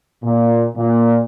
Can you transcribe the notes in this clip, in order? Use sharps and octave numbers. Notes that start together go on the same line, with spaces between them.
A#2
A#2